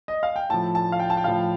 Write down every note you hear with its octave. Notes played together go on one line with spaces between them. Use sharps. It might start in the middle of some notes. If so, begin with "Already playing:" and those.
D#5
F5
G5
A2 F3 A5
A5
F5
G5
A5
G5
A2 F3 F5